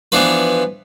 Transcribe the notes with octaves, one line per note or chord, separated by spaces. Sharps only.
E3 F3 B3 D4 F4 B4